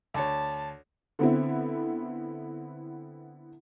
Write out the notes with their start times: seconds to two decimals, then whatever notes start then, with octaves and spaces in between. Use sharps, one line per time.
0.14 D2 C#5 A5
1.19 D3 B3 C4 E4